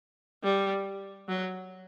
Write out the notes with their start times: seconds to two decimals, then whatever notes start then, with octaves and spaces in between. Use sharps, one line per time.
0.44 G3
1.29 F#3